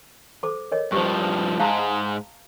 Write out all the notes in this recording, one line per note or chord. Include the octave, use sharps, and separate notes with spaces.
A4 C5 D6
A#4 C#5 D#5
G2 F3 G4 C5
G#2 G#3 F5 A5 A#5